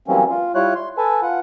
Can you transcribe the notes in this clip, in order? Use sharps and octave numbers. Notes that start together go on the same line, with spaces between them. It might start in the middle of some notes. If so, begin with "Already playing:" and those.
E3 F#3 G3 A#3 C4 C#4
F4
G3 E4 F4 C#5 F#6
C6
A4 B4 G#5 A5
F4 F#5